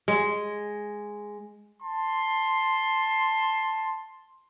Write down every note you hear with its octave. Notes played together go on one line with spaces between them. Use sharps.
G#3
A5 C6